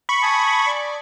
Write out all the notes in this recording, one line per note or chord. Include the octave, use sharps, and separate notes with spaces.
B5 C#6
G#5 A5 D#6
D5